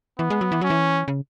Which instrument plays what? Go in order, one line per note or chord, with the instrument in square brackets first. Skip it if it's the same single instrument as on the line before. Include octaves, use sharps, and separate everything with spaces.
[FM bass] E3 [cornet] B3
[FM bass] G#3
F#3
E3
[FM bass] F#3 [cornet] C#4
[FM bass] E3
C#3